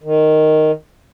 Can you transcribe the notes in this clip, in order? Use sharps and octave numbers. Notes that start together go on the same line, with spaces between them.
D#3